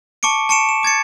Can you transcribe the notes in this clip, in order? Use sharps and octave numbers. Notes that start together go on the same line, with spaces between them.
A5 C#6 D6 C#7 D7
A5 C#6 C#7 D7 E7
E7
D6 G#6 A6 C#7